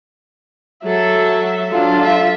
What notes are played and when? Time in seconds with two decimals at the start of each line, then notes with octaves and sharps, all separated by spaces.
0.84 F#3 A4 E5
1.72 F#3 D4 F4 A4
2.03 E5